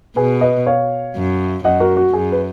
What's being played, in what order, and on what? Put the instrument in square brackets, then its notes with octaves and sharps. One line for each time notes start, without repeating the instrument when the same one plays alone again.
[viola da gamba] B2 [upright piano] G#4 B4
[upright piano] B4 D#5
C#5 F5
[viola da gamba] F#2
[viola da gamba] F#2 [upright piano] D#5 F#5
[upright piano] F#4 A#4
F#4
[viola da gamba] F#2 [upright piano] G#4
[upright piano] B4